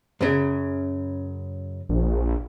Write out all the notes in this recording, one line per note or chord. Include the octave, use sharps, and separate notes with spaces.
F#2 C#3
A#1